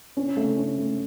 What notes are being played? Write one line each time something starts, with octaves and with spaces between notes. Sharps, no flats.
C#4
A3
C#4
A3